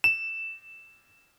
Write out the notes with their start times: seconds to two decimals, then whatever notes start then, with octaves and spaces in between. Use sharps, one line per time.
0.04 E7